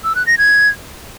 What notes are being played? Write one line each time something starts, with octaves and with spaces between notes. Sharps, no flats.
E6
F#6
A#6
G#6